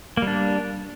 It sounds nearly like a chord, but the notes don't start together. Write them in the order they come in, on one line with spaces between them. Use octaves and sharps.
A#3 G3 D4